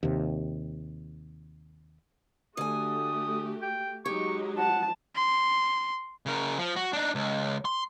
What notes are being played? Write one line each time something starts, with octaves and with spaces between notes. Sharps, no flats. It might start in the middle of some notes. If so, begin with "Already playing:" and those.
D#2 C3
D3 A3 F#4 G4 G#5 D#6
G5
F#3 G#3 D#4 G4 C#6
F#5 A5
C6
C#3 A#4
F3
F#4
D4 D#4
C#2
C6